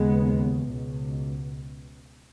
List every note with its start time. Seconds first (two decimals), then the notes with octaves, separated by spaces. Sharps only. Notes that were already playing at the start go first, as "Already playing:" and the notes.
Already playing: D#2 C#3 G#3 B3
0.67 C#2 B2